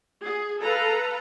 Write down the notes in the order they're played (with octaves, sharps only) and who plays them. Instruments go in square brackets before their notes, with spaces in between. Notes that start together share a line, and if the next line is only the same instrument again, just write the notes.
[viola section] G#4
A4 B4 F5 A#5